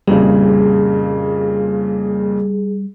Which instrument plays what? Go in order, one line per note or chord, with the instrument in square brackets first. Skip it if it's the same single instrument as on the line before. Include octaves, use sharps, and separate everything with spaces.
[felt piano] F2 A#2 C#3 [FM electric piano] G3 [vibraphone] G#4